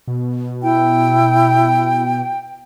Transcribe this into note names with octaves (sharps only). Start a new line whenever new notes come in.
B2
E4 G5